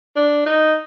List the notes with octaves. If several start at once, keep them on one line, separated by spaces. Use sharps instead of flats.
D4
D#4